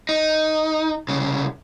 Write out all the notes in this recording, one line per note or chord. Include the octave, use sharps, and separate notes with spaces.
D#4
C2 C#3